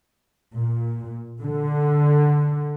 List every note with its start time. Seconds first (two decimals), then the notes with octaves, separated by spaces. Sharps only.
0.58 A#2
1.43 D3